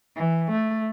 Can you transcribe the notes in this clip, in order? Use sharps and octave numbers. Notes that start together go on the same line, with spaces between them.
E3
A3